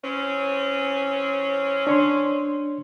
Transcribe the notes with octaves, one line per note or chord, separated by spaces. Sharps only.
E3 C4 C#4
D4 C#5 C6